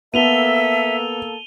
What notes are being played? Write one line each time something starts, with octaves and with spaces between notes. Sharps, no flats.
A#3 B3 A4 E5 D#7 F7 G7